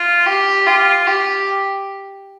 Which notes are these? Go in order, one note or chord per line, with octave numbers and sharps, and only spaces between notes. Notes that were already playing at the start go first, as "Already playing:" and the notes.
Already playing: F4
G4
F4
G4